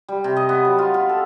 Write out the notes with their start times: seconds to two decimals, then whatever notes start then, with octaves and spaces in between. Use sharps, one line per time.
0.08 G3
0.24 C3
0.37 D#5
0.49 B3
0.65 F#3
0.78 F4
0.94 F4
1.09 A4